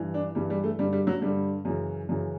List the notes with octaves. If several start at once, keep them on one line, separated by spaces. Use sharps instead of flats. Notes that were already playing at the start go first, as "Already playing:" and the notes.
Already playing: G2 E3
D4
G2 E3 G3
G3
A3
G2 D3 G3
G3
F#3
G2 D3 G3
F#2 C#3 E3
F#2 C#3 E3